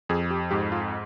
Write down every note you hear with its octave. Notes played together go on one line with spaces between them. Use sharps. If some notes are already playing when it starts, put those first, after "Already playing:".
F2 G#4
G4
G#2 G4
F4